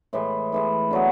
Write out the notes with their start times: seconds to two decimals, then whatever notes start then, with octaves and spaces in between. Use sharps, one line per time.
0.13 A2 E3 G#3
0.52 A2 E3 G#3
0.91 D3 F#3 B3